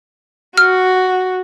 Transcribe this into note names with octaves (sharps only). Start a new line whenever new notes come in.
F#4 F6